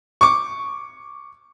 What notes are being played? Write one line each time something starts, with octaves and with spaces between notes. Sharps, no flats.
C#6 D6